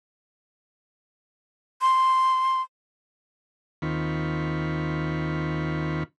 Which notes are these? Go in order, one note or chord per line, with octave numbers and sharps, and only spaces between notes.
C6
D#2 D#3 C4 F4 B5 C#6